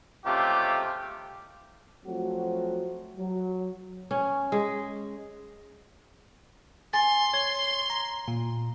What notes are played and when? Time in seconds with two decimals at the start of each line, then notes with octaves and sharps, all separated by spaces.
0.25 C#2 C3 A3 F4 G4
2.05 F3 F#3 A3 C4 F#4
3.18 F#3
4.11 C#4
4.52 G#3
6.93 G#5 C6 A6
7.34 C#5 G#6
7.90 A#5
8.28 A#2